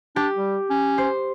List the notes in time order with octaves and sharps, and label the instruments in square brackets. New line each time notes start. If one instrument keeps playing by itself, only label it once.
[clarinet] D4 [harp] G4
[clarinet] G3
C#4
[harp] C5